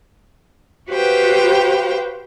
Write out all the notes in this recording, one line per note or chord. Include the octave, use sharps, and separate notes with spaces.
F#4 G4 B4 C5 F5 G5